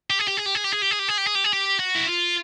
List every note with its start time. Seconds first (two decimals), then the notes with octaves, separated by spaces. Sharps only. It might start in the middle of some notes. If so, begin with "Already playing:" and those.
0.10 G4
0.19 G#4
0.27 G4
0.37 G#4
0.46 G4
0.55 G#4
0.64 G4
0.73 G#4
0.82 G4
0.91 G#4
0.99 G4
1.08 G#4
1.18 G4
1.27 G#4
1.35 G4
1.44 G#4
1.53 G4
1.79 F#4
1.95 E4
2.07 F4